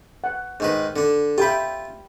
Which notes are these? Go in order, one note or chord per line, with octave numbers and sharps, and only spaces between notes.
F#5
G#2 D#3 B4
D3 D4
F4 G4 E5 G5 B5